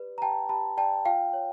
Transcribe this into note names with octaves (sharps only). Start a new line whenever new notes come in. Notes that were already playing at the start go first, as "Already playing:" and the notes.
Already playing: G4 B4 D5
A#5
G4 G5 A5
G4 A5 B5
D5 G5 A5
F4 F5 G5
C#5